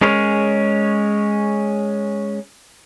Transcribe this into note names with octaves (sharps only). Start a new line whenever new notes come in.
G#3 C#4 G#4 A#4 C#5